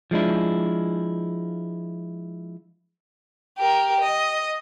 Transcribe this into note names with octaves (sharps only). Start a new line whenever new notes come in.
F3 G#3 D4 E4
G4 A#4
D#5